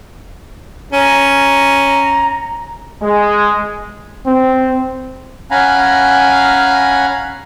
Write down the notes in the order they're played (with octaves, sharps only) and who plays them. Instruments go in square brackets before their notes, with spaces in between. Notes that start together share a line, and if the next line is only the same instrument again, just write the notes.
[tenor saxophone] C#4 [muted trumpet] A#5
[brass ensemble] G#3
[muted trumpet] C4
[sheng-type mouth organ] C#4 F5 F#5 G#5 A#5 B5